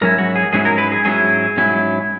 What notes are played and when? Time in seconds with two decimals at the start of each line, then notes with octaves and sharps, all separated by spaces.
0.01 G#2 F#3 C#4 E4 A#4
0.18 F#4
0.36 G#4
0.53 G#2 F#3 C#4 E4 G#4
0.65 A#4
0.78 B4
0.92 G#4
1.05 G#2 F#3 C#4 E4 G#4
1.57 G#2 F#3 C#4 E4